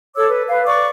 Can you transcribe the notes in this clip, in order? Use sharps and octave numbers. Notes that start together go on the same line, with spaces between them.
A4 C#5 D6 E6
B4
B4 F5
D5 C#6 D6